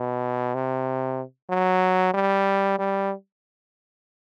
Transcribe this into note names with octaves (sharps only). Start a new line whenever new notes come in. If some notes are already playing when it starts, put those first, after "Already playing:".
Already playing: B2
C3
F#3
G3
G3